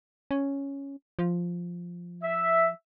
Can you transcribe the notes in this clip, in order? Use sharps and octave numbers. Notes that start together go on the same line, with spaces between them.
C#4
F3
E5